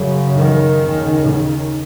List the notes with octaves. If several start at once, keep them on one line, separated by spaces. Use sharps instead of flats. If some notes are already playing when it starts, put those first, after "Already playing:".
Already playing: F#2 C#3
D#3
D#2 C#3
D#3